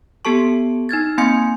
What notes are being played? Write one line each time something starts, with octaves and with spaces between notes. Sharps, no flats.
B3 G4 A4 A5 C#6
D#4 F6 G#6 A6
A#3 C4 G#5 C6 G6 C#7